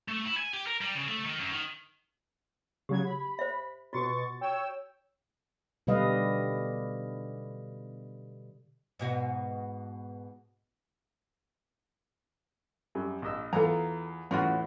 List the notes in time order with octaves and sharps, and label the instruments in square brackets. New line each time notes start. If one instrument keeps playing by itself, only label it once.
[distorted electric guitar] A3
E4
G#5
G4
A#4
G3
C#3
A3
D#3
F#2
D#3
[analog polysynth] C#3 F#3 G#6 [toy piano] G4
[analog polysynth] B5
[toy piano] C5 E5
[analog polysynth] B2 C#6 A6 [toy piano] F4 F#4
[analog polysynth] C#5 G5 E6
[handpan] B2 D3 G3 B4 D#5 F5
[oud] G#2 B2 F#4
[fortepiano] F#2 G3
A#1 D#5 E6
[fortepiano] E2 F4 [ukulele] A4 A#5
[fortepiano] E2 A2 C6 [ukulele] C#4 F4 F#4